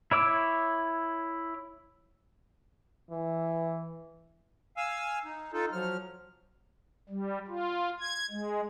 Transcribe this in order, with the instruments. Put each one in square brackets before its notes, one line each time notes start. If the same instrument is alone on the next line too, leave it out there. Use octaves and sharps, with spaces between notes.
[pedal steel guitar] E4 C#5 D6 E6
[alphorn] E3
[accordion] F5 G#5 E6
D#4
D#4 F4 A4
F3 F#3 F6
[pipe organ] G3
F4
G#6
G#3